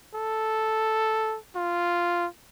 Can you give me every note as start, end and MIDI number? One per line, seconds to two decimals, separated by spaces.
0.15 1.37 69
1.56 2.27 65